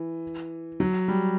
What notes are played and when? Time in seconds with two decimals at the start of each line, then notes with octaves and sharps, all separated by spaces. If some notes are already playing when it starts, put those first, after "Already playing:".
Already playing: E3
0.80 F#3
1.08 G3